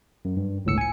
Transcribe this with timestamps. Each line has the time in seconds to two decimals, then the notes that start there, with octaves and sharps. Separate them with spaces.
0.25 F#2
0.37 G2
0.65 G1 C#2 A2 E6 C#7
0.78 G#5 C#7